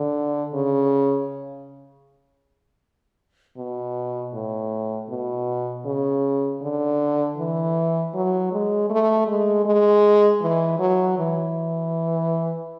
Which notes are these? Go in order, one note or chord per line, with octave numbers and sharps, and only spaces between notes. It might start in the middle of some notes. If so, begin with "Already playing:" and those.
Already playing: D3
C#3
B2
A2
B2
C#3
D3
E3
F#3
G#3
A3
G#3
G#3
E3
F#3
E3